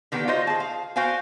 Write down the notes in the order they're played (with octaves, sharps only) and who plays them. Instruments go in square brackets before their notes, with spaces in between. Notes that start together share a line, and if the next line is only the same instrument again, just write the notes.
[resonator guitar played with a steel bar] D3 D#3 B3 G4 G5
F4 F#4 C5 D#5
G#4 A5
F5
F#4 C5 F5 G5 G#5